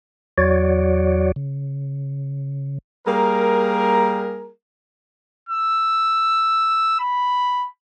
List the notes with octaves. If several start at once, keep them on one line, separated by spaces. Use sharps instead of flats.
E2 F#3 F#4 C#5 D5
C#3
G3 A#3 G#4 A#4
E6
B5